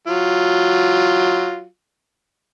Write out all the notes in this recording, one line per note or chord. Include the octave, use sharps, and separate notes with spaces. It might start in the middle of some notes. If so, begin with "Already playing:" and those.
F#3 F4